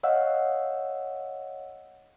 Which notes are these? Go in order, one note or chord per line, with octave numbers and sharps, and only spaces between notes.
C#5 D#5 F5 F#5 E6